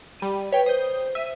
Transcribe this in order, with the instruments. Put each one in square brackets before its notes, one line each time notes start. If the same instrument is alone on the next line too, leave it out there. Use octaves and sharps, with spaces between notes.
[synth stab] G3 D#7
[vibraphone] B4 [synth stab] C#5 G5
[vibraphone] C5 [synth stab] D#6 G6
[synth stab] E5 D#7